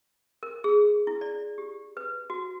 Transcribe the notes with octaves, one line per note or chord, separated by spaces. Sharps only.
A#4
G#4
E4
D5
G4
B4
F#4